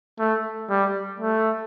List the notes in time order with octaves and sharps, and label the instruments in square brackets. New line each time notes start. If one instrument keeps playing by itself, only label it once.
[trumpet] A3
G3
A3